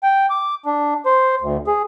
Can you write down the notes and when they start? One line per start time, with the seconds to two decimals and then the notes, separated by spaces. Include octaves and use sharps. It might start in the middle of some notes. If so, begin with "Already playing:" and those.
0.03 G5
0.30 D6
0.66 D4
1.06 C5
1.41 D2
1.67 G#4